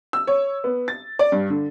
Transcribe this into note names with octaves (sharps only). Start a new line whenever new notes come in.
E6
C#5
B3
A6
D5
G2
D3